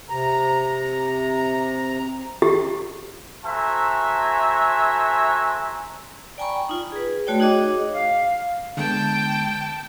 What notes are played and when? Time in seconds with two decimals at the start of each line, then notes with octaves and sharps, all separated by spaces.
0.10 C3 A#5
2.42 G4
3.45 A3 F#4 C5 E5 G#5 A#5
6.38 D5 G5 G#5 A#5 B5 C#6
6.69 D#4 F4
6.92 G#4 B4
7.27 A3 F#4 C#5 D5 G5
7.40 D#4 F#4 G#4 C#5 D#5 D6
7.93 F5
8.77 D3 G#3 B3 G5 A5